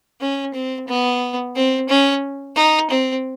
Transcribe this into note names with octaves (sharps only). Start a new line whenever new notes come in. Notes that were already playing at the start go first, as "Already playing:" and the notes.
C#4
C4
B3
C4
C#4
D#4
C4